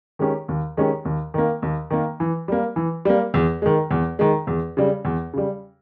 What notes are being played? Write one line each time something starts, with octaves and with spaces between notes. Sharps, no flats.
D#3 G#3 C#4 G4
D#2
D#3 G#3 C#4 G4
D#2
D#3 A#3
D#2
D#3 A#3
E3
G3 A#3
E3
G3 A#3
E2
D#3 G#3
E2
D#3 G#3
E2
C#3 G3
E2
C#3 G3